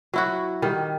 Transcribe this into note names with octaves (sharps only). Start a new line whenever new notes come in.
F#3 E4 F#4
D#3 G3